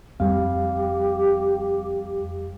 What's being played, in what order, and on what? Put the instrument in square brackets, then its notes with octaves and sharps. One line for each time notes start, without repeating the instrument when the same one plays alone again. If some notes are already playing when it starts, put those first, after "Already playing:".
[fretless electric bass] F2 C4 [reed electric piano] G3 F5 [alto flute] G4